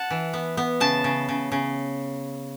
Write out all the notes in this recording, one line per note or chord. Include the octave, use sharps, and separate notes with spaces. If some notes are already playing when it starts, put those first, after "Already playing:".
Already playing: F#5 A5
E3
B3
B3
C#3 A5
C#3
C#3
C#3